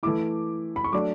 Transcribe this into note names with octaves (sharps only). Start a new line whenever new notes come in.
E3 A3 E4 D6
B5
C#6
F#3 A3 D4 D6